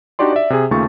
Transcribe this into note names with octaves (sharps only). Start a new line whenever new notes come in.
D4 D#4 F#4 G4 D5 C6
D5 E5
C3 G#4
D#2 C#3 A3 F4 C#6 A6